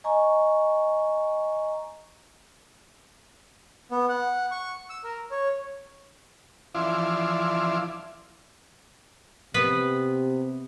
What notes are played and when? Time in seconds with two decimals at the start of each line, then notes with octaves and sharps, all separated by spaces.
0.04 D#5 G#5 A#5 C#6
3.91 B3
4.09 F#5
4.51 C#6
4.90 E6
5.04 A#4
5.31 C#5
6.75 E3 F3 E4 D5 F5 C6
9.54 C3 B3 B4